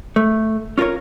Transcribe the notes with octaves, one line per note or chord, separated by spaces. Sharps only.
A3
C#4 F4 G#4 A#4 C#5